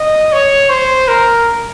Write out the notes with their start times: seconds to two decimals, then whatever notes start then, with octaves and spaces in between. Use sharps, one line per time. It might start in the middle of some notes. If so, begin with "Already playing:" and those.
Already playing: D#5
0.32 C#5
0.70 C5
1.08 A#4